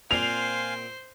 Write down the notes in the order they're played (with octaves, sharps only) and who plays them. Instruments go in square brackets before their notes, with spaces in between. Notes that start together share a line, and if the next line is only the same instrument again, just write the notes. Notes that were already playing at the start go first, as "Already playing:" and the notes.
[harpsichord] A#2 C4 [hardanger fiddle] C5 [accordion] F5 G#5 [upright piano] F7